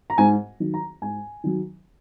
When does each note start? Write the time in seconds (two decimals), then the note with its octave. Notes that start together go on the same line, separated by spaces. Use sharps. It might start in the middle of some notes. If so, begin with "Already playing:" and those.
0.10 A#5
0.18 G#2 G#5
0.60 D#3 F#3
0.74 A#5
1.02 G#2 G#5
1.44 D#3 F#3